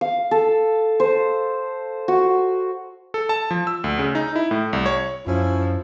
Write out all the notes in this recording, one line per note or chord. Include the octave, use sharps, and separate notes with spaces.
F5
A4
C5
F#4
A4
A5
F3
E6
D2
C#3
D#4
E4
A2
C2
C#5
F#2 F3 C#4 E4